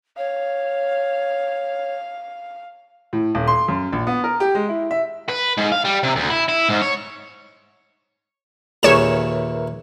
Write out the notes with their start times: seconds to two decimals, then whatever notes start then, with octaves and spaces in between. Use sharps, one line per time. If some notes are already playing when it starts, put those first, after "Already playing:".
0.18 C#5 F5
3.13 A2
3.35 D#1
3.48 C6
3.68 F#2
3.93 A#1
4.07 B3
4.24 A#4
4.40 G4
4.55 G#3
4.69 E4
4.91 E5
5.29 B4
5.58 G#2
5.72 F5
5.85 G3
6.03 C3
6.16 D2
6.30 E4
6.49 E4
6.69 G#2
6.82 C#5
8.83 D#2 A#2 G#4 A#4 B4 C#5 E5 E7